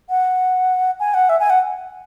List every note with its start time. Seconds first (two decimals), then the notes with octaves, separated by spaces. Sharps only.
0.10 F#5
1.00 G#5
1.14 F#5
1.29 E5
1.40 G#5
1.50 F#5